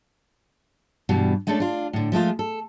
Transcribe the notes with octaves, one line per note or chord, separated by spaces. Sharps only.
G2 B2 E3 G3
G#3 A3 C#4 D4 A4
D4 F4
A2 D3
F3 G#3 A3 F4
A4